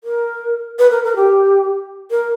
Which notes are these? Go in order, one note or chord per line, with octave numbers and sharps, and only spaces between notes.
A#4
B4
A#4
A#4
G4
A#4